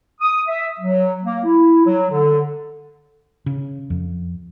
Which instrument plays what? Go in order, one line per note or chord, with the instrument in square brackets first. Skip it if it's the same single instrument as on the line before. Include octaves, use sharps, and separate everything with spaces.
[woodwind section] D#6
E5
F#3
A#3
E4
F#3
D3
[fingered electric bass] C#3
F2